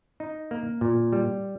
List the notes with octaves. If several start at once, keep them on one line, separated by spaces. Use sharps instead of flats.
D#4
A#3
A#2
G3